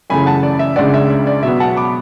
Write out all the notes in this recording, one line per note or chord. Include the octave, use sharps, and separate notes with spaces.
F#2 C#3 E3 A3 G#5 B5
F#5 A5
D5
E5
C#2 C#3 G#3 D4 D5 F#5
E5
D5
D5
B2 F#3 B3 E5
F#5 A5
B5 D6